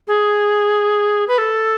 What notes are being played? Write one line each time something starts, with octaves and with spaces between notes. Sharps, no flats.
G#4
B4
A4